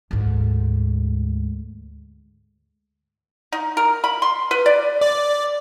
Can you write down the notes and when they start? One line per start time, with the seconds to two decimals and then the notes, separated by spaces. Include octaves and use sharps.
0.11 D2 G#2
3.52 D#4
3.77 A#4
4.04 B5
4.22 C6
4.51 B4
4.66 D5
5.01 D5